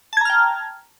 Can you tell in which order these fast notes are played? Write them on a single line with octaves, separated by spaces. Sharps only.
A5 G#6 A#5 F6 G5